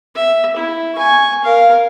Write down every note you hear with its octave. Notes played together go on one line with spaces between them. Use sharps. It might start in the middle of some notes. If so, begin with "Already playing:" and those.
E5
E4
G#5 C#6
A#4 F5